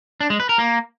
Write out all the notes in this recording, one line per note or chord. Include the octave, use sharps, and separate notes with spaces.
D4
G#3
B4
A#4
A#3